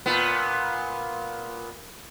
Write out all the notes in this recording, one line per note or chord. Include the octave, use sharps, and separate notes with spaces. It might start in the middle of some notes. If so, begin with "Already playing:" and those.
A#2 B3